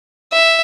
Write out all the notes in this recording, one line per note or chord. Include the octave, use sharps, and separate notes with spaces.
E5